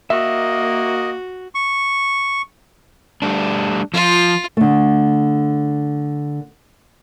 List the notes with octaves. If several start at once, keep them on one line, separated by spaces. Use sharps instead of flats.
A#3 F#4 D#5 E5
C#6
G3 A3 D4
F3 F4
D3 A3